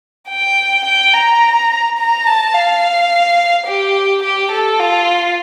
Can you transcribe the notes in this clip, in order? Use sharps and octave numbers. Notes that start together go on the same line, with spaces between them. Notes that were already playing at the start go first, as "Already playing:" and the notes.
G5
G5
A#5
A#5
A5
F5
G4
G4
A4
F4